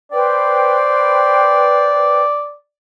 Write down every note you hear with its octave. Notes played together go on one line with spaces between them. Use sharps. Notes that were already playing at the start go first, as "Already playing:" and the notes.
B4 C5 D5 G5